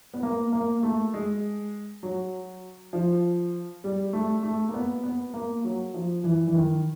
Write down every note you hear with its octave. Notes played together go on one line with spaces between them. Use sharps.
B3
A#3
A#3
A3
G#3
F#3
F3
G3
A3
A3
A#3
B3
B3
A#3
F#3
F3
E3
E3
D#3